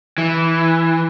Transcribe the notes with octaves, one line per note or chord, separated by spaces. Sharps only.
E3